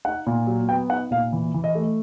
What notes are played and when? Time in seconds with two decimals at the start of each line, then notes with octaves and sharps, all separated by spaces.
0.05 D#4 F#5
0.27 A#2
0.47 F#3
0.69 B3 G5
0.89 D#4 F#5
1.11 A#2 F5
1.33 E3
1.54 E3
1.64 D#5
1.75 A3